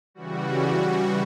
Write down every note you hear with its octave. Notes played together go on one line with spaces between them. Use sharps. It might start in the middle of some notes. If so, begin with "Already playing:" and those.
C#3 E3 G3 F#4